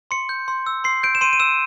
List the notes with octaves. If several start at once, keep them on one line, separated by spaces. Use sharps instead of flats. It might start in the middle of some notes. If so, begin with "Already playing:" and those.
C6 C#7
G6
C6
E6
C6 C7
G6 D7
E7
C6 D#7
D#7
E6 E7